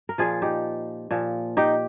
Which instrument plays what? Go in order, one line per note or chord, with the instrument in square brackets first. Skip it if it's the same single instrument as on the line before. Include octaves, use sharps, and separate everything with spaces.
[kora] A#4
A#2 F3 F4 G#4
D#4 G4
A#2 F3
D#4 G4